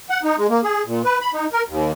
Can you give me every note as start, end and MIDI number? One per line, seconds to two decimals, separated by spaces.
0.10 0.20 78
0.23 0.36 63
0.38 0.47 56
0.50 0.61 58
0.63 0.83 68
0.86 1.02 46
1.04 1.18 71
1.21 1.31 83
1.33 1.46 63
1.53 1.62 70
1.68 1.92 39